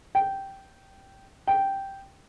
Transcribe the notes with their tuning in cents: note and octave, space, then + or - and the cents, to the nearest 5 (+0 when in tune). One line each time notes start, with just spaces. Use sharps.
G5 -10
G5 -5